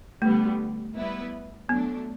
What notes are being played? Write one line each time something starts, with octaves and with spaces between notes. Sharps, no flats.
D3 G3 A3 B3
G3 B3 E4 B4
F#3 A3 B3 D4